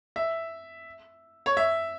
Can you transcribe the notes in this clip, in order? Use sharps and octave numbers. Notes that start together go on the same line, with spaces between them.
E5
C#5
E5